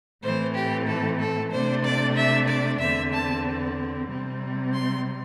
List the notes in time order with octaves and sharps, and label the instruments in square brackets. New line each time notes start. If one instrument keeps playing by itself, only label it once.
[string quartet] A2 E3 A3 C4 C5
G4
A4
A4
C3 A3 D4 C5
D5
E5
D5
E2 D3 C4 E5
A5
C3 G3 C4
C6